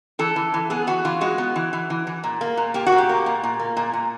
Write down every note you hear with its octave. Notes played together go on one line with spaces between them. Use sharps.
E3 A4
E3
E3
B3 G#4
E3 F#4
E3 F4
G#3 F#4
B3
E3
E3
E3
E3
A#2
A#3
A#2
A#3 G4
F#4
A#2
G4
A#3
A#2
A#2
A#3
A#2
A#2